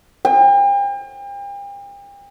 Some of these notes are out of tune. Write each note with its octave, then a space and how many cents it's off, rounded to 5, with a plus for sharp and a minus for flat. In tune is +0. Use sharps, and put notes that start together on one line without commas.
G5 +40